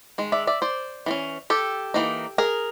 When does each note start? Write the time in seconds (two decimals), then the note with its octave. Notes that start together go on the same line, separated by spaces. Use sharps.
0.18 D#3 G#3
0.32 D5 E5
0.47 D5 E5
0.62 C5 D5
1.06 E3 A3 C#4
1.50 G4 A4
1.94 E3 G3 A#3 D#4
2.38 G#4 A#4